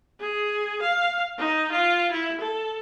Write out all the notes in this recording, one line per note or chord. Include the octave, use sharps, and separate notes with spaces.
G#4
F5
D#4
F4
E4
A4